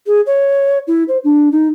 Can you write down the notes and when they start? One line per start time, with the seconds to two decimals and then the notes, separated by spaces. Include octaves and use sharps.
0.07 G#4
0.27 C#5
0.88 E4
1.08 C5
1.24 D4
1.52 D#4